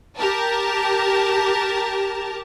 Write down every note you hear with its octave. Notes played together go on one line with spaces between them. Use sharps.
G4 A#4 A5